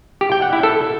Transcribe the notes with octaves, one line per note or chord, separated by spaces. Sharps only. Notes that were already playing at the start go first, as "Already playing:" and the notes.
G4
G5
F#5
E4
A4